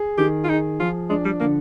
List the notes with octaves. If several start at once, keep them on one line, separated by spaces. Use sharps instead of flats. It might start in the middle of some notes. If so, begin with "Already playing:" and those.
Already playing: G#4
D#3 G4
F4
D#4 G#4
F3 F4
G#3 D4
G3
D3 A#3